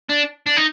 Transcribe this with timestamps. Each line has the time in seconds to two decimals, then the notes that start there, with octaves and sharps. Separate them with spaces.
0.09 D4
0.46 D4
0.57 D#4